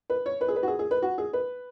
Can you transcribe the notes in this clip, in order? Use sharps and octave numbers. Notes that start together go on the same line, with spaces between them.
B4
C#5
B4
G#4
B4
F#4
G#4
G#4
B4
F#4
G#4
B4